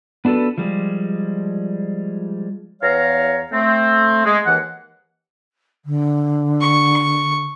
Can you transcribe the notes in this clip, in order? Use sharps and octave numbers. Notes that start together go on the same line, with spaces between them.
B3 D4 F#4 A4 B4
F3 G3 G#3
E2 C#5 F5 A#5
A3 C4
G#3
D#2 E3 F#5
D3
C#6